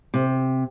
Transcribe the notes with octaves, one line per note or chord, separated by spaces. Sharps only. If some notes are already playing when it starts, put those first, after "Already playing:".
C3